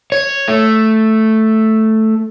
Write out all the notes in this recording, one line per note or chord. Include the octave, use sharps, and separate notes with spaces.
C#5
A3